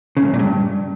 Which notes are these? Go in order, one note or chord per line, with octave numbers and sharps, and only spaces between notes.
C#3
A2
F#2
A#2
G2